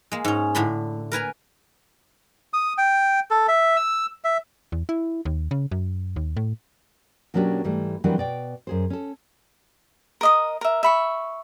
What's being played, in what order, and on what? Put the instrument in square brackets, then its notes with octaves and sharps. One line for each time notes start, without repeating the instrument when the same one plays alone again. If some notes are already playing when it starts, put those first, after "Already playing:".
[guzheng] G#3 A#3
G#2 C#4
A2 D3 D4 B5 C6
A#4 B4 G#5 A#5
[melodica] D#6
G5
A4
E5
E6
E5
[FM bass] E2
E4
D#2
C#3
F#2
D#2
A2
[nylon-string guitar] B2 F#3 A#3 C#4 D4 G4
G#2 E3 G3 A3
D#3 E3 F#3 G3 C4 D4
B2 D5 G5
F#2 G#4 C5
C#4 A4
[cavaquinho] A#4 D#5 D#6
A#4 E5
E5 B5 C#6